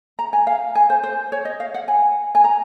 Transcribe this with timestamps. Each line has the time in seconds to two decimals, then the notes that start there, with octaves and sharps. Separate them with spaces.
0.19 A#5
0.33 G#5
0.47 F5
0.75 G#5
0.90 C5
1.03 C5
1.32 C#5
1.45 D#5
1.60 F5
1.74 F#5
1.88 G#5
2.35 G#5
2.44 A#5